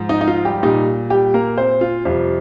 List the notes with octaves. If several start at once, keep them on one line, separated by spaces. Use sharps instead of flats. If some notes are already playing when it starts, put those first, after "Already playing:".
Already playing: G#2 F3
D#4
D#4
F4
G3 G4
A#2 G3 D#4
G3 G4
A#3 A#4
C4 C5
F4
F2 C3 G3 F4